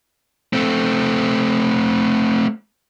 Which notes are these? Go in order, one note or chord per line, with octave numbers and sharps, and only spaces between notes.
A3 C4